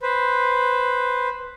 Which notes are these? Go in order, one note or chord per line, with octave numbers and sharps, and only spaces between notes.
B4 C5